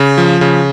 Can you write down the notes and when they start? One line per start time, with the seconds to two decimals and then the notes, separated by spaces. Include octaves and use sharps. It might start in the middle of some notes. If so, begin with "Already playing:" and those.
Already playing: C#3
0.18 F3
0.41 C#3